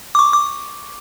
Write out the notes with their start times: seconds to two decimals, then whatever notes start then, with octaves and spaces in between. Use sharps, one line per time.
0.15 D6
0.19 C#6
0.33 D6